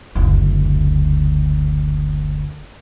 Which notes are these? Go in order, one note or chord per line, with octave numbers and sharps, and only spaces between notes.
F#1 D2